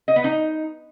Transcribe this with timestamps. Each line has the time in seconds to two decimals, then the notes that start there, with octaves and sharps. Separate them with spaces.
0.08 D#5
0.16 B3
0.24 D#4